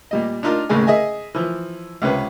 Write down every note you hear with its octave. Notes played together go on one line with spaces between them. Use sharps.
A#2 G3 D#5
D4 D#4 F4 A#4
A1 D#2 C#3 G#3 G#5
G#4 D#5 E5 G#5
E3 F3
C#2 C3 C#4 B4